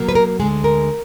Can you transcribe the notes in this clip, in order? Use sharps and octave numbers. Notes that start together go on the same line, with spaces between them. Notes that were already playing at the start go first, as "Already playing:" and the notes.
Already playing: B2 F#3 A#3
B4
A#4
D2 D3 G#3 G#4
A#4